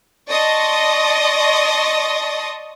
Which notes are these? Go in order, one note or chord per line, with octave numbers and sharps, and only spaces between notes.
D5 D#5 A5 C6 C#6 D#6